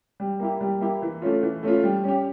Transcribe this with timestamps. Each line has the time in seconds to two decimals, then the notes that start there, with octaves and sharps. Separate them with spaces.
0.20 G3
0.40 A#3 E4 G4
0.61 G3
0.81 A#3 E4 G4
1.02 E3
1.22 A3 C#4 F4
1.43 E3
1.63 A3 C#4 F4
1.83 G3
2.04 C#4 G4